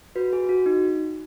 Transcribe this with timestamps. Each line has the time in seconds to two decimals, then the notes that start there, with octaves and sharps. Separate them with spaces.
0.16 F#4 B4
0.33 G#4
0.49 F#4
0.66 D#4